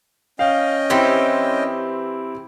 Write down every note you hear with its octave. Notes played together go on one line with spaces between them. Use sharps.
C#4 D#5 F5 G5
E3 C4 E4 G4 C5